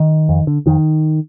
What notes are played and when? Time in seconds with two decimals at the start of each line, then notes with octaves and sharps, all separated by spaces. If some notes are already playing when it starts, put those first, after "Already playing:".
Already playing: D#3
0.29 F2
0.47 D3
0.66 F2 D#3